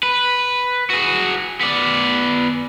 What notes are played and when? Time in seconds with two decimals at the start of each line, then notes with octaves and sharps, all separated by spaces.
0.03 B4
0.90 F#4 G#4
1.61 B3 D5